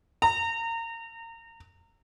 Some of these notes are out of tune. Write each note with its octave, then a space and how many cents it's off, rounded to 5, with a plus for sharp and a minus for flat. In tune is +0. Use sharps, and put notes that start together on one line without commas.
A#5 -30